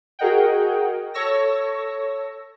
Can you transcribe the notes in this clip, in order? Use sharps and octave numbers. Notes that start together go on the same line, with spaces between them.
F#4 G#4 A#4 D#5 F#5 G5
A4 C#5 C#6 E6 A#6